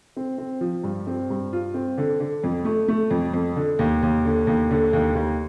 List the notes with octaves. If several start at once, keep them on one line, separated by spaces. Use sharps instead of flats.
C4
C4
F3
G2
C4
G2
F4
C4
D3
D3
F2
A3
A3
F2
F2
D3
D#2
D#2
D3
D#2
D3
D#2
D#2